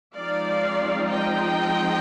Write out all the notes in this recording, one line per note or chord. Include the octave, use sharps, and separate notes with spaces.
F3 G#3 C4 D#4 D5 F5
D#5 G5